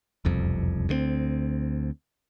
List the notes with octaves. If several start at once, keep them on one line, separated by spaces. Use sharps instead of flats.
E1 C2 F2
D2 G#3 C4